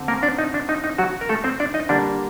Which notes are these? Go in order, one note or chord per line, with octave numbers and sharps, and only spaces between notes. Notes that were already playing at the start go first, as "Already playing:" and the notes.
Already playing: D3 C4
A#3 A#4
D4 D5
D#4
D4
D#4
D#4
F#3 F#4
A#4
A3 A4
C4 C5
D4 D5
D#4 D#5
D3 G3 A#3 D4 D5